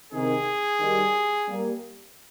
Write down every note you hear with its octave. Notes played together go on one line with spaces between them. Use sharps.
C3 D#3 G#4
D#3 G3
G3 A#3